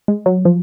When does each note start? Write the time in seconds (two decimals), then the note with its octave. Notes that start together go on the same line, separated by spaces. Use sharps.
0.08 G#3
0.26 F#3
0.45 F3